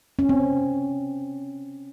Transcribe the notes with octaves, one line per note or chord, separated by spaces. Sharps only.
C#4
C4